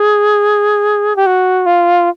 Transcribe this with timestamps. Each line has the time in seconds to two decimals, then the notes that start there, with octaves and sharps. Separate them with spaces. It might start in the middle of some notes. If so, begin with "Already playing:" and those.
Already playing: G#4
1.16 G4
1.26 F#4
1.66 F4